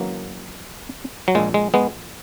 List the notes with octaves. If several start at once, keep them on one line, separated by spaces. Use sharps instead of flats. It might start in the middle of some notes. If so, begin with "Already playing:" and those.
Already playing: G#1 F#2 C#3 E3 F#3 A#3
F#3
A#1 A#2 G#3
G#3
G#3 B3